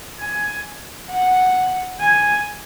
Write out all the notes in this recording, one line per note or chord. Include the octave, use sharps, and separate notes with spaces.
G#5
F#5
G#5